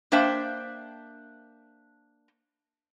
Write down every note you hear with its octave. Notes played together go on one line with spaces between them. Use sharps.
A#3 D4 C5 E5 G5